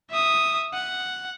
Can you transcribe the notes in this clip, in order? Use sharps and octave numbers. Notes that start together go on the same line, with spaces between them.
E5 D#6
F#5